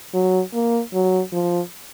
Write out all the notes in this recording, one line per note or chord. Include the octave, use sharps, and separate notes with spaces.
F#3
A#3
F#3
F3